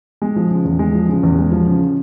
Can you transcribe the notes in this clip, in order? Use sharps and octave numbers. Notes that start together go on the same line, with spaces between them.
G#3
F3
C#3
E2
G#3
F3
C#3
E2
G#3
F3
C#3